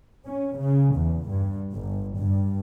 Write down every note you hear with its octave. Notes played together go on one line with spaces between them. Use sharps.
C#4
C#3
E2
G2
G1
G2